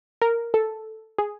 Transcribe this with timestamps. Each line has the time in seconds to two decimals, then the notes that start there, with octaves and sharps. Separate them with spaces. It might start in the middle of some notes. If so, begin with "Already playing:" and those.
0.22 A#4
0.54 A4
1.18 G#4